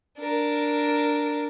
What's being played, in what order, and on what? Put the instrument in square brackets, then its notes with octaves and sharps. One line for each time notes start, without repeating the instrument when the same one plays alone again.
[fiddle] D4 A#4